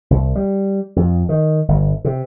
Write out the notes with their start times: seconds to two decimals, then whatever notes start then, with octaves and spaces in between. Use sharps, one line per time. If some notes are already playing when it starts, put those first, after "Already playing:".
0.10 C2
0.35 G3
0.96 F2
1.29 D#3
1.68 G1
2.05 C3